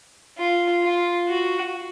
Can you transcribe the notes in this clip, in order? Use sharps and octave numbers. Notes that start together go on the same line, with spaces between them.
F4
F4
F#4